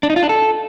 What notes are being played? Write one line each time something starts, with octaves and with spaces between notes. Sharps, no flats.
D4
D#4
F4
D4
A4